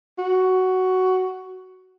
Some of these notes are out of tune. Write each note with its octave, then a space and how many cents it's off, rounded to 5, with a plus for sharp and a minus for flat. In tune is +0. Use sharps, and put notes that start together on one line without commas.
F#4 +10